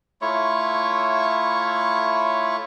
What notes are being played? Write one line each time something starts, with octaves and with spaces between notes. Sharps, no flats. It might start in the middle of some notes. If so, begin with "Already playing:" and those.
A3 E4 F4 C#5